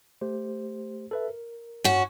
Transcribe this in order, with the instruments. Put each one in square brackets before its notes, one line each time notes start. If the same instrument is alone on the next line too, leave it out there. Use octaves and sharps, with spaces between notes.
[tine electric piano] A3 G4 C5
A4 B4 E5
A#4
[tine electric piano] G2 [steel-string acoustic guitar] C#4 F#4